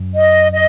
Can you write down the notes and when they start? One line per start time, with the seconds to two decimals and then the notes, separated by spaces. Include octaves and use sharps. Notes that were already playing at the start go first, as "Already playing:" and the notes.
Already playing: F#2
0.14 D#5
0.52 D#5